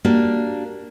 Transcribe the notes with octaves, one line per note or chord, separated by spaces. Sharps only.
A#3 D4 F#4 G4